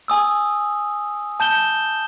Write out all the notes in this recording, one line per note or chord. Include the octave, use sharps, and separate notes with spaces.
G#5 D#6 E6
A5 G6 E7 G7